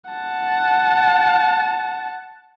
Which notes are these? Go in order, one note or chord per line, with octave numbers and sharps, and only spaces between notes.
F#5 A5